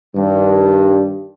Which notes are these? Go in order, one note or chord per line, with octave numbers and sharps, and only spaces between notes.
G2 D#3